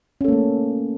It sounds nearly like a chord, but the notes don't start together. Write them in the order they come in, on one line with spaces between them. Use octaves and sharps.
C#4 A4 A#3 A3